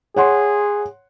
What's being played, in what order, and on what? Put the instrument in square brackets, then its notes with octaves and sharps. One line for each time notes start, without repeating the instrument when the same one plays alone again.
[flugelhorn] G#4 [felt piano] C#5 F#5 C6